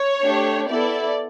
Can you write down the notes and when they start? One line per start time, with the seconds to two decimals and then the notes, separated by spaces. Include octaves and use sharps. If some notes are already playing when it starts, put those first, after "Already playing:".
Already playing: C#5
0.22 A3 D4 G4
0.68 B3 E4 A4 D5